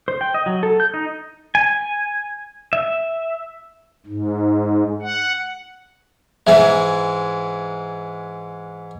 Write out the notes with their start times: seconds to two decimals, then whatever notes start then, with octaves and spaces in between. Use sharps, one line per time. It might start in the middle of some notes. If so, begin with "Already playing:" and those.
0.08 C5
0.21 G5
0.34 D#5
0.46 F#3
0.63 A4
0.80 G6
0.94 D#4
1.55 G#5
2.73 E5
4.07 G#2
5.02 F#5
6.47 G#2 E3 G#3 E5